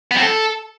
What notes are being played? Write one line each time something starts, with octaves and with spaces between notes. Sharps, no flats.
B3
C4
A4